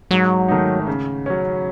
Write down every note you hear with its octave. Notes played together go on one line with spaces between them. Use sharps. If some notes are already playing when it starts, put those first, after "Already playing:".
G#2 F#3
D#3 A3 D#4
C#3
F#3 C#4